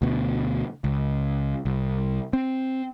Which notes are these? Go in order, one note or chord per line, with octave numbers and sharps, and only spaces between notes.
D2 B2
C#2
C2
C4